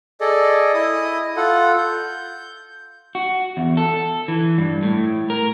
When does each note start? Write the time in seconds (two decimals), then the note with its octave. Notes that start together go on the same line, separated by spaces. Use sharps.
0.21 G#4 A4 D5 D#5
0.74 E4 D#5 D#6
1.36 F4 A4 F#5
1.78 G6
3.15 F#4
3.57 E2
3.77 A4
4.28 E3
4.58 G2
4.83 A2
5.30 A#4